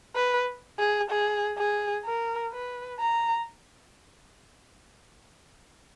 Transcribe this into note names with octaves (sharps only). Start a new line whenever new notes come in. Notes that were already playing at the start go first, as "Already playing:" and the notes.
B4
G#4
G#4
G#4
A#4
B4
A#5